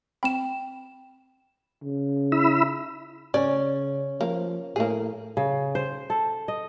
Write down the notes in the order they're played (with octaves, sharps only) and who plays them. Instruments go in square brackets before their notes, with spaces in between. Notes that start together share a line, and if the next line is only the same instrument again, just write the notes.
[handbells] C4 B5 [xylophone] G5 E7
[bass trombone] C#3
[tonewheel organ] E4 B5 E6
[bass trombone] C#3 [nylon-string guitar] C#4 [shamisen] D5
[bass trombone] F3 [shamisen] A#3
[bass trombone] A2 [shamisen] A#3 G#4
[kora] C#3
C5
A4
D#5